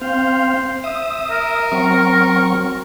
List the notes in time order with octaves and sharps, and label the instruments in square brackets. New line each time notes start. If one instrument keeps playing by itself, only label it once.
[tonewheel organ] C4 F5 [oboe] C5
[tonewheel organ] E5 D#6
[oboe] A#4
[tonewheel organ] F#3 C4 C#6